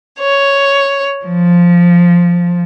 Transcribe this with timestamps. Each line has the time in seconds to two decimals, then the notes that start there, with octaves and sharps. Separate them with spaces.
0.17 C#5
1.25 F3